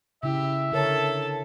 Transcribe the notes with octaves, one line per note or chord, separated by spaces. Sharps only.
C#3 E4 G4 E5
D3 A4 A#4 C#5 A5